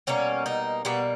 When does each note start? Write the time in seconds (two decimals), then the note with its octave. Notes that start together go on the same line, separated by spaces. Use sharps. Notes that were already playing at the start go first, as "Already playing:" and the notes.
0.07 B2 G3 A#3 C#4
0.46 D#4
0.85 B2 G3 A#3 B3